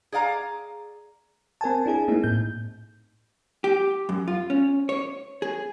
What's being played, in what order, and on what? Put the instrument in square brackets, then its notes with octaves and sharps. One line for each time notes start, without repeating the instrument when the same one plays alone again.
[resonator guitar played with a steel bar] G#4 D5 F5 A#5
[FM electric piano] C4 A#4 G#5 A5
D4 E4 G#4 G#5
A3 A#3 C4 D#4 E4
A2 G6
[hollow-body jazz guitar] G4
F#2
F4
C#4
C#5
G#4